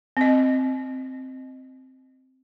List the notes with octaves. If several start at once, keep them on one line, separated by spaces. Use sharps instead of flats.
C4 D#5